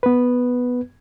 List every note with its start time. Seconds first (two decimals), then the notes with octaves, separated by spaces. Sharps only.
0.03 B3 B4